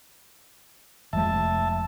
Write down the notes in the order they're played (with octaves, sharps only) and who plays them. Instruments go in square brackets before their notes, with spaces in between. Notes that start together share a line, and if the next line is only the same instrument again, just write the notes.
[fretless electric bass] F1 F3 G#3 [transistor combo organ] E5 A5